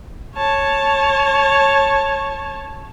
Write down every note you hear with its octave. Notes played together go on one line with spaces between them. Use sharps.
C#5 A5